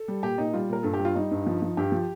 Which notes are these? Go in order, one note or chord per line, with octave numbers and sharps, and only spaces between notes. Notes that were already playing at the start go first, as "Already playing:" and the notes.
Already playing: A4
G3
A#2 G4
A#2 D#4
G3 F4
A#2 A#4
G2 A4
G4
G3
F4
G3 D#4
G2
F3
F3
G2 G4
F3